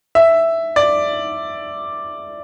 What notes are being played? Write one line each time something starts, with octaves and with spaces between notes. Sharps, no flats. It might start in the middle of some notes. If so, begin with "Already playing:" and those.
E5
D5